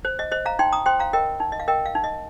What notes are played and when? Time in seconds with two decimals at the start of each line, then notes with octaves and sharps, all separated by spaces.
0.05 C5
0.19 D#5
0.31 C5 D#5
0.46 F5 A#5
0.59 D#4 G5 C6
0.72 A#5 D#6
0.86 C5 G5 C6
1.00 F5 A#5
1.13 A#4 D#5 G5
1.40 D#4
1.52 D#5
1.60 F5
1.68 A#4 D#5 G5
1.86 F5
1.95 D#4
2.04 D#5